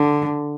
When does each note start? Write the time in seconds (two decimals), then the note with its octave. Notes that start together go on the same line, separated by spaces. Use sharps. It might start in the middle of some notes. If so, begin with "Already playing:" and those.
Already playing: D3